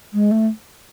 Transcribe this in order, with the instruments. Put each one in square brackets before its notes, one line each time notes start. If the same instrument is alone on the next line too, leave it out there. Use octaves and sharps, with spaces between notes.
[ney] G#3
A3